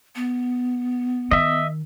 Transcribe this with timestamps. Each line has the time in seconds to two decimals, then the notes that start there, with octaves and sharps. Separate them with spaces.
0.16 B3
1.31 D#3 D#5 E5